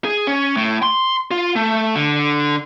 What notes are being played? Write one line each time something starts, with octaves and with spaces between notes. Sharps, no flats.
G#4
C#4
A2
C6
F4
A3
D3